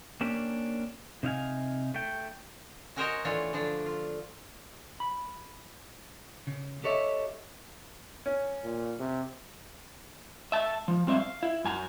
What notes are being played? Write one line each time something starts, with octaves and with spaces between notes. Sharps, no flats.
A#3 C#4 D4 G4
C3 D#4 F5 G#5
A3 G5
C#4 F#4 A#4 C5 C#5 D#5
E3 A3 D4 F4 C#5
D3 F3 D4
F4
B5
C#3
G4 A4 C#5 D#5 E5
C#4
A#2
C3
E5 A5
F3
G3 C4 C#5 E5 F5
F5
E4
F#2 G#5 A#5